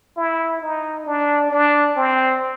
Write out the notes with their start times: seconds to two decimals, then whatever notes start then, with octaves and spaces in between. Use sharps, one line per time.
0.17 E4
0.62 D#4
1.06 D4
1.51 D4
1.96 C4